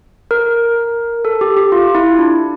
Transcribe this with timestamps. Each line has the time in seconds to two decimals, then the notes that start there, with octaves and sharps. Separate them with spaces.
0.31 A#4
1.25 A4
1.41 G4
1.57 G4
1.72 F4
1.95 E4
2.19 D4